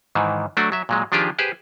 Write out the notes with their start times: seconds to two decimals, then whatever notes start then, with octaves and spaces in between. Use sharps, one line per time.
0.15 G#2 D#3 E3
0.57 F#3 A3 D4 F#4
0.72 F#3 E5
0.89 A#2 F#3 G#3
1.12 D#3 F3 D4 F4 G4 G#4
1.39 G4 G#4 B4 C5